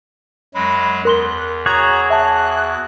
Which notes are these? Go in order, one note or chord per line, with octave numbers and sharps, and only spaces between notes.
F#2 F#3 G#3 B5
E2 A#4 C6 F#6 G7
F#4 G#4 C#5 A#5
E5 A5 F#6